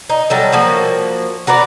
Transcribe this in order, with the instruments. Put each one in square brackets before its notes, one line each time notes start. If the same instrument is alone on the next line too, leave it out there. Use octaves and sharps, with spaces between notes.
[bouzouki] D#4
F#3 G3 A4
F3 A#3 F#4
F#4 A#4 B4 D5